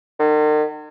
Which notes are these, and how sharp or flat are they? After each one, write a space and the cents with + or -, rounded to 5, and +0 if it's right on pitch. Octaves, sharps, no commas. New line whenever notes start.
D#3 -40